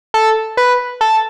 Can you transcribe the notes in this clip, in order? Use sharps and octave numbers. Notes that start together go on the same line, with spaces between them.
A4
B4
A4